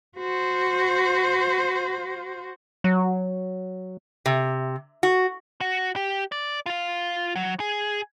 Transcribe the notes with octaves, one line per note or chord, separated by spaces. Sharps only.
F#4 C5
F#3
C3
F#4
F#4
G4
D5
F4 F5
F#3
G#4